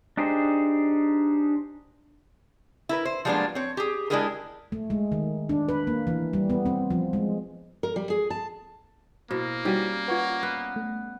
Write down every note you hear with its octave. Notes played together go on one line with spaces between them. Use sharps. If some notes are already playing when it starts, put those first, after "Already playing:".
D4 D#4 G4 G#4 C5
E4 A#4 B4
C5
F3 G3 G#3 A#3 B3 D4
C4 C#5
G4 G#4
G#3 D4 E4 G4 G#4 A#4
A3
G#3
D#3
D4
B4
A#3
E3
G3
B3
C4
F3
G#3
A#4
G3
G#4
A5
B2 A#3 E4 C5
G3 C#4 D#4 F#4 G4
F4 B4 F#5 C#6 G#6
B3 F#6
A3